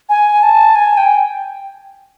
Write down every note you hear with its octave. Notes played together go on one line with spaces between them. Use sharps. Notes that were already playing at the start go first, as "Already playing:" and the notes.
G#5
A5
G#5
G5